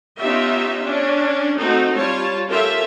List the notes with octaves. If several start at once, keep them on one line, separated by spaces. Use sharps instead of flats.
B3 C#4 D#4 F4 G4 E5
C#4 D4
A3 C4 D#4 F#4 A4
G3 F4 C#5 A5
C#4 F4 G4 A4 A#4 E5